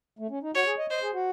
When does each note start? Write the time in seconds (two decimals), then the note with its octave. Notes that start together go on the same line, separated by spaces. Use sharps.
0.19 A3
0.31 C#4
0.43 D#4
0.55 F#4 C#5
0.67 G#4
0.79 D#5
0.90 C5 D#5
1.02 G#4
1.14 F#4